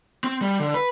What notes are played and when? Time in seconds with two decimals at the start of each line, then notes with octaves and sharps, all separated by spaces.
0.24 C4
0.42 G3
0.59 D3
0.74 B4